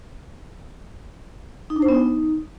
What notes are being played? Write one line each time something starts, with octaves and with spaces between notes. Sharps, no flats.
D#4
D4
C5
B3
D#4